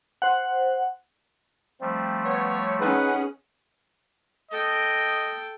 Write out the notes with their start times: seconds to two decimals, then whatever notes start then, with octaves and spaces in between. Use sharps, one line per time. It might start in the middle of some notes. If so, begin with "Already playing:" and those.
0.22 C5 F#5
1.81 F3 G3 A3 C4
2.25 B3 C#5
2.81 C#4 D#4 G#4 B4 F#5
4.51 A4 D#5 G5